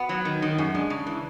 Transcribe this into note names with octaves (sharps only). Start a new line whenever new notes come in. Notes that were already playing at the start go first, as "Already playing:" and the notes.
Already playing: B3 F#4
F#3
D#3
D#3
F#2 G#4
G#3 D4
C#3
E3